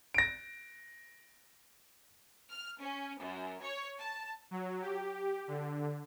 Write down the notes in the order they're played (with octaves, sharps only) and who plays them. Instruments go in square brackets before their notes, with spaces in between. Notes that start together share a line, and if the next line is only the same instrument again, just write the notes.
[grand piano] A#6 D7
[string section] F6
C#4
F#2
C#5
A5
[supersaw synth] F#3
G4
D3